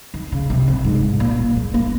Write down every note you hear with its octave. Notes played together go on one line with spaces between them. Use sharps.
D#3
C#3
C3
C3
G#2
A#2
G#3
A#3